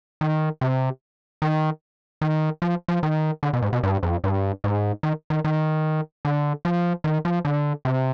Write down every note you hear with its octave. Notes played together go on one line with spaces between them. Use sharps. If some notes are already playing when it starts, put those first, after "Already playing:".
D#3
C3
D#3
D#3
F3
F3
D#3
D3
B2
G#2
B2
G2
F2
G2
G#2
D#3
D#3
D#3
D3
F3
D#3
F3
D3
C3